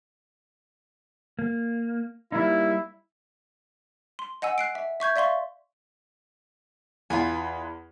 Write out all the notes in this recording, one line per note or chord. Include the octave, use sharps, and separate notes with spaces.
A#3
G3 A#3 D#4 E4
C6
D#5 F#5 G#5 E6
F#6 C7 D7
E5
E5 C#6 G6 G#6
D5 E5 F5 C6 C#6
E2 F4 B4 G#5